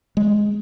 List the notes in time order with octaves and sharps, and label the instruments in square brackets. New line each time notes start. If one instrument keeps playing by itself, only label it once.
[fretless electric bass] G#3